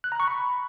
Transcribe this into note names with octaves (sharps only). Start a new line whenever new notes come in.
F#6
A#5
C#6
B5